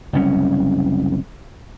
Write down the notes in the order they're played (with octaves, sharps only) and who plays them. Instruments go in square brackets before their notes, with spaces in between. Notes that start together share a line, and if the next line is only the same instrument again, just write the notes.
[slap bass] F#1 C2 C#4